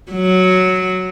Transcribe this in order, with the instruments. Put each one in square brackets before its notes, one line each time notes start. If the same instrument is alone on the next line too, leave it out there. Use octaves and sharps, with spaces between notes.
[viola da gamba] F#3